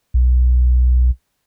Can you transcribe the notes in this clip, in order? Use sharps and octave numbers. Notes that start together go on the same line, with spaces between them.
B1